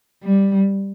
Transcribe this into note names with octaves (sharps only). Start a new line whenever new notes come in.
G3